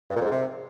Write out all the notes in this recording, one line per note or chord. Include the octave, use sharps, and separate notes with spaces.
G2
A#2
F2
G#2
C3